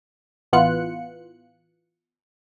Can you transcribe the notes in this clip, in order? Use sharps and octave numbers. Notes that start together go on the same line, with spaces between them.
A1 E3 B3 F4 F#6 C#7